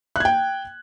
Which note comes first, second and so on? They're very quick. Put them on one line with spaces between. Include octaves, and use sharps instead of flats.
F#6 G#6 G5